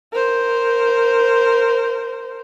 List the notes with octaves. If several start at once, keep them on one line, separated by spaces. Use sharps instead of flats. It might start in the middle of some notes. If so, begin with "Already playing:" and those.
A#4 C5